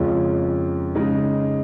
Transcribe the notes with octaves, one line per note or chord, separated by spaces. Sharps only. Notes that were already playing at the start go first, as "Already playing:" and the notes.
Already playing: F2 C#3 G#3 C#4 F4
C#3 G#3 D#4